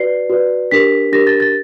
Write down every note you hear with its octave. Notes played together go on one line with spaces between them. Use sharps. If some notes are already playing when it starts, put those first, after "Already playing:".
Already playing: F#4 B4 D5 C7
F#4 B4 D5
D4 G4 A#4 B6
D4 G4 A#4 A#6
A6
A6